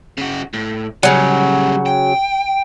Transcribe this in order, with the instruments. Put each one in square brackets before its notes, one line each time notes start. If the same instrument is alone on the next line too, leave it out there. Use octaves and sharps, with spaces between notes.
[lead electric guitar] C#3 F#4
A2
[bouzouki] C#3 F#3 [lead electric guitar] G3 C#4
[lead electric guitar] G5